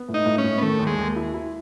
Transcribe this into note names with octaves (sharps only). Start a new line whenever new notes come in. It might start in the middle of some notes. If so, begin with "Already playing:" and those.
Already playing: B3
A2
D#4
A2
C#4
A2
B3
D#3 A3
D#2
G#3
D#2
E4
E4